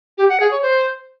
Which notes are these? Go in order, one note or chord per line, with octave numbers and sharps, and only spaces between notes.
G4
F#5
G#4
C#5
C5